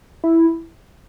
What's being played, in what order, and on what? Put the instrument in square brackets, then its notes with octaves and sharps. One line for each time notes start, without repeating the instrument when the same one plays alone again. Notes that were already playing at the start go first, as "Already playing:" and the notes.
[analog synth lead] E4